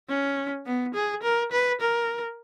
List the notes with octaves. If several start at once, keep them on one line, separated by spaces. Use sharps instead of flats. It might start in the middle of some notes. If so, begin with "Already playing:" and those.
C#4
B3
G#4
A#4
B4
A#4